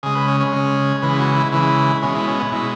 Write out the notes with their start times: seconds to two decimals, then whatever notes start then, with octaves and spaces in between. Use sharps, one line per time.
0.03 C#3 G#3 G#4
0.15 B4
0.28 C#4
0.40 C#4
0.53 C#3 G#3
1.02 C#3 E3 G#3 B4
1.19 F#4
1.36 E4
1.52 C#3 E3 G#3 E4
2.02 B2 G#3 C#4
2.15 E4
2.27 C#4
2.40 B3
2.52 B2 G#3 E4